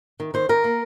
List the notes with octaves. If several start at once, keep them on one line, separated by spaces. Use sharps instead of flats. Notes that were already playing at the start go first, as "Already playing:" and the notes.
D#3
D#3 C5
D#3 A#4
A#3